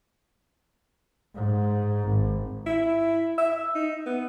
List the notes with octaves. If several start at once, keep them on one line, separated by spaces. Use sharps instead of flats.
G#2
G#1
E4
E5
D#4
B3